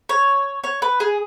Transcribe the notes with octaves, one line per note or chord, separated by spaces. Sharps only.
C#5
C#5
B4
G#4